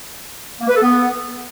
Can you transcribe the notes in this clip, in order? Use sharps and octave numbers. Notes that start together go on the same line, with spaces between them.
A#3
B4
A4
B3